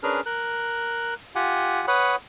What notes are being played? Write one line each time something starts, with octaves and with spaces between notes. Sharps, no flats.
C#4 D4 G#4 A#4 B4 F6
A#4 F#6
F4 G4 F#5 G#5
B4 C#5 F#5 B5 D#6